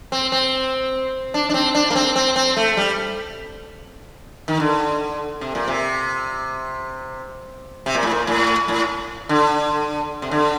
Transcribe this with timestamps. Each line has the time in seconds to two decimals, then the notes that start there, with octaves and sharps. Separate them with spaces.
0.12 C4
0.32 C4
1.34 D4
1.49 D4
1.54 C4
1.75 D4
1.90 A#3
1.96 C4
2.16 C4
2.36 C4
2.57 A3
2.77 G3
4.48 D#3
4.60 D3
5.41 C3
5.55 A#2
5.68 C3
7.86 C3
7.95 A#2
8.03 A2
8.11 A#2
8.27 A2
8.68 A2
9.29 D3
10.22 C3
10.31 D3